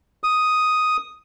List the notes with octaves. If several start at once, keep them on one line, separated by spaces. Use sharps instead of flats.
D#6